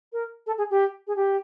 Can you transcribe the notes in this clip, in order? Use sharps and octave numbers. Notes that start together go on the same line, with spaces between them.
A#4
A4
G#4
G4
G#4
G4